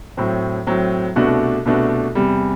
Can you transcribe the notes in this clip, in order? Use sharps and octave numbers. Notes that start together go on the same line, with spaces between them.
A2 F#3 C4
A2 F#3 C4
C2 B2 A3 D4 F#4
C2 B2 A3 D4 F#4
E2 C3 G3